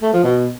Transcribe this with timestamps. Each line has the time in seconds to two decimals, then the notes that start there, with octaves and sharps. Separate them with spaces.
0.02 A3
0.13 F3
0.24 B2